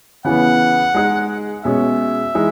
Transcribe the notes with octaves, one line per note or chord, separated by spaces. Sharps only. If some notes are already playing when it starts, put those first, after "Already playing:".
C#3 E3 B3 F#5
G#3 D#4 G#4
B2 G#3 C#4 G#4 E5
E3 G#3 D#4